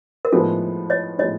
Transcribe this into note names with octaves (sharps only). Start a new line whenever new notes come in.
A#4
A2 F3 G#3 B3 D#4 A4
C#5 D#5
A2 F3 G#3 B3 D#4 C#5 D#5